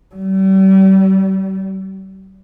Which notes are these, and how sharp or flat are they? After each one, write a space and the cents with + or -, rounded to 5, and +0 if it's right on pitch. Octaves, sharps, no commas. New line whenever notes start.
G3 -40